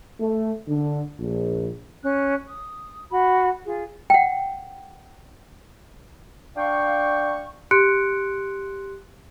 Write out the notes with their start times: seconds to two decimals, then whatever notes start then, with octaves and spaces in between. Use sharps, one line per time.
0.20 A3
0.68 D3
1.20 A#1
2.02 C#4 F#6
2.47 D#6
3.09 F#4 B5
3.65 F4 G#4
4.10 F#5 G5
6.56 D4 F5 G5 C#6
7.71 G4 C6 F#6 C#7 D7